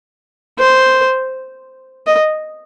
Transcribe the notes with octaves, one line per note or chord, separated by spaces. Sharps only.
C5
D#5